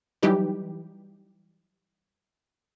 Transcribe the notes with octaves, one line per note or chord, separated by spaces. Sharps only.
E3 F#3 G3 D#4 G4 B4